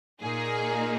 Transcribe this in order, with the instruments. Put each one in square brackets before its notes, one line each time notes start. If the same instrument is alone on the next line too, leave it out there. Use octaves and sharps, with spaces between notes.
[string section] A#2 A#3 D#4 G#4